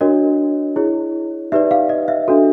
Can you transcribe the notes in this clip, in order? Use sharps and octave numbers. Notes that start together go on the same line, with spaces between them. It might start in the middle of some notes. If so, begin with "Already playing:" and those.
D4 F#4 A#4 C#5 D#5
E4 G#4 C#5
D#4 G4 B4 D5 E5
F5
D#5
E5
D4 F#4 A4